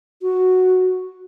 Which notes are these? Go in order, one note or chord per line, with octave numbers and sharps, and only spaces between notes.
F#4